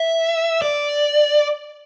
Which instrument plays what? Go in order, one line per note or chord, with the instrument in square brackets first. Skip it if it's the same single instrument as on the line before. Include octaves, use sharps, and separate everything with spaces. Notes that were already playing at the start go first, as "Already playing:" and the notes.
Already playing: [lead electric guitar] E5
D5